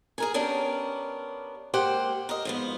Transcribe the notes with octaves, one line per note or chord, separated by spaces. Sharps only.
G#4 A#4 G#5
B3 C#4 D4 G4 A#4 G5
G#3 A#3 G4 C5 F#5 G5
A#4 D#5
G#2 F3 B3